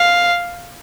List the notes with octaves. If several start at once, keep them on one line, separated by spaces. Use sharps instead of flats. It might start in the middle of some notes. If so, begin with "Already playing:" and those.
Already playing: F5